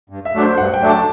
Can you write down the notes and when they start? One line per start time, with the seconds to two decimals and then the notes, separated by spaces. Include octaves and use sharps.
0.10 G2
0.25 E5
0.34 F#3 A3 D4
0.42 C5
0.58 G2 F#5
0.74 G5
0.81 F#3 A3 D4
0.90 A5